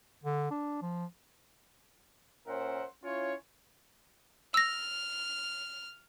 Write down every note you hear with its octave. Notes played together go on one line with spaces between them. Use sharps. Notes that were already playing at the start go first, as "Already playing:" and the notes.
D3
D4
F3
A#2 C#4 A#4 C5 E5 F#5
C#4 E4 F4 C#5
E6 F6 A#6